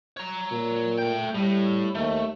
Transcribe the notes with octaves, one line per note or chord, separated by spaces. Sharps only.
C#5 A#5
A#2
A3 G5
A2 G3
D#2 A3